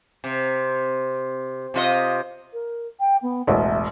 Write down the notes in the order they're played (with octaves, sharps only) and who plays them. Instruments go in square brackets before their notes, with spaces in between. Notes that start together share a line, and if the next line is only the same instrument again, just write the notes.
[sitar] C3
C3 F4 D#5
[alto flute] A#4
G5
B3
[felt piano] E1 A1 [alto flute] E5